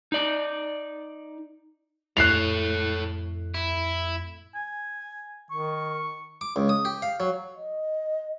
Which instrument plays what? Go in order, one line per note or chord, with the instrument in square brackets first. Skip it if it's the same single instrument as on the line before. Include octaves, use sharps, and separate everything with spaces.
[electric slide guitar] D#4 D5
[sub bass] F2 [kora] A2 [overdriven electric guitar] A4 C#5 [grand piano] F#6 C7 F7
[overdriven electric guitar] E4
[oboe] G#5
[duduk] D#3 [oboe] C#6
[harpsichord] D6
C#2
D#6
G4
F5
F#3
[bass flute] D#5